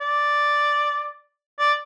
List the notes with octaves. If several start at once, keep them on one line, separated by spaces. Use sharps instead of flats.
D5
D5